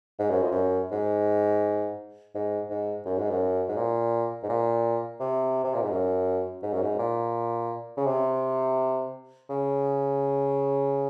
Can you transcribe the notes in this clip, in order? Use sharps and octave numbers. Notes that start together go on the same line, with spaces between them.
G#2
F#2
F2
F#2
G#2
G#2
G#2
F#2
G#2
F#2
G#2
A#2
G#2
A#2
C3
C3
A#2
G#2
F#2
G#2
F#2
G#2
A#2
C#3
C3
C#3